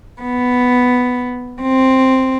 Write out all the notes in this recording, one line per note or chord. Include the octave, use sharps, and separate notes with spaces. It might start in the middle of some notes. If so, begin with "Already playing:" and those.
B3
C4